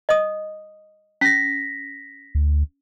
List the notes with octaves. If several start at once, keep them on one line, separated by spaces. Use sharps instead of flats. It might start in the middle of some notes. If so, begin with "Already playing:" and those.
D#5 D#6
C#4 A#6 B6
D2